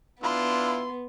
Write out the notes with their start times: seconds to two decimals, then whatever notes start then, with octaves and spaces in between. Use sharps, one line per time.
0.23 B3 D4 E4 F4 C6